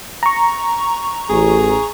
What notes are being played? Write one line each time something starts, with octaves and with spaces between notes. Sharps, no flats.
A#5 C#6
A1 G#4